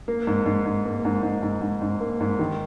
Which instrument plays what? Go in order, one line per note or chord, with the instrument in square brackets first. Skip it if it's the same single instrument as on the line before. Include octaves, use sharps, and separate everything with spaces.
[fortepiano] A#3
G#2
G#2
G#2
A#3
G#2
G#2
G#2
G#2
G#2
A#3
G#2
D#3